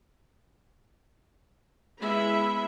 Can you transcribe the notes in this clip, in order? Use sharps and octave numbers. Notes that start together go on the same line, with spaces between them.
G#3 B3 E4 E5 B5